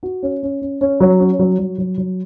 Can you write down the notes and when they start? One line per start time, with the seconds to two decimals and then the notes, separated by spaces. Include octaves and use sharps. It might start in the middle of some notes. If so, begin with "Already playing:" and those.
0.03 F#4
0.23 C#4
0.43 C#4
0.61 C#4
0.81 C#4
1.00 F#3
1.20 C#4
1.39 F#3
1.59 F#3
1.78 F#3
1.98 F#3